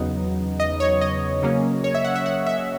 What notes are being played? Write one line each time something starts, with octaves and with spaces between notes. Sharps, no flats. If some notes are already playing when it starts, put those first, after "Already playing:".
Already playing: E2 C#3 F#3 B3 D#4
D#5
C#5
D#5
C#3 F#3 A#3 C#4
C#5
E5
F#5
E5
F#5
E5